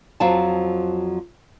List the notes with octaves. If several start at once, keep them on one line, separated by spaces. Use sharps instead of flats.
F2 F3 F#3 F5 A5